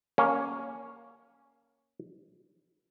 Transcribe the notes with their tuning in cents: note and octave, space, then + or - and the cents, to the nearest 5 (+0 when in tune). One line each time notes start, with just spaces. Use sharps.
A#3 +0 C#4 +0